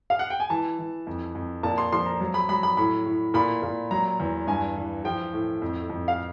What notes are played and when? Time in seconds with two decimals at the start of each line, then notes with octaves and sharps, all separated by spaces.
0.10 F5
0.19 F#5
0.30 G5
0.40 G#5
0.50 E3 A5
0.79 E3
1.07 F2
1.35 F2
1.63 A#2 A5
1.78 C6
1.92 F3 C6
2.06 A#5
2.21 F#3
2.34 B5
2.49 F#3 B5
2.63 B5
2.77 A2 B5
3.06 A2
3.34 A#2 B5
3.62 A#2
3.91 F#3 A#5
4.20 E2
4.47 G2 G#5
4.76 E3
5.04 F3 G5
5.33 A2
5.62 F2
5.89 F2
6.08 F5